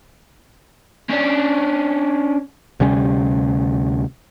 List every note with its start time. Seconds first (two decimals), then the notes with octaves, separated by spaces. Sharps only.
1.10 C#4 D4
2.80 D2 C3 G3 C#4